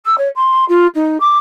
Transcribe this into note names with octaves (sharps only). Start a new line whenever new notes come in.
E6
C#5
C6
F4
D#4
D6